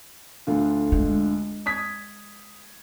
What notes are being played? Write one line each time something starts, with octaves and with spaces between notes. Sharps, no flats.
D2 D3 F4
G#3
D#6 G#6 B6